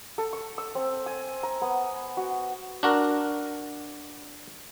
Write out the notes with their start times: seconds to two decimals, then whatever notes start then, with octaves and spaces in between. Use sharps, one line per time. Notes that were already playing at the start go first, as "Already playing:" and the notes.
0.18 A4
0.33 C#6
0.58 E6
0.75 C4
1.06 G#5
1.43 A#5
1.62 B3
2.17 F#4
2.83 D4 F#4 A#4